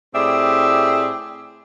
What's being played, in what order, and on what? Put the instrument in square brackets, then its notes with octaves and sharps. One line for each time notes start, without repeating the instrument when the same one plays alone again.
[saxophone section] A2 C4 G4 G#4 D5 E5